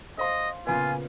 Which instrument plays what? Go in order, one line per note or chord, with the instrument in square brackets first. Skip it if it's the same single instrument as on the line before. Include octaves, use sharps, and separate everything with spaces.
[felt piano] C5 F5 C6 [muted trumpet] D#5
[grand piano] A#2 C#3 B3 [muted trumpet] F4 [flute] G#5